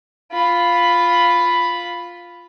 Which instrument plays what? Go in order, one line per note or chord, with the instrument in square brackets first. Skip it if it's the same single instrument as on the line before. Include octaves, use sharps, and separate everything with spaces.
[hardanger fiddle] F4 B5